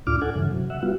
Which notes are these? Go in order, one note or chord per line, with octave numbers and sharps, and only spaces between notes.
D2 A2 D4 F4 D6 F6
D4 A4 F#5 G#5
G2 C#3 E3
C3 F#3
E5 F#5
G3 B3 F4 F#4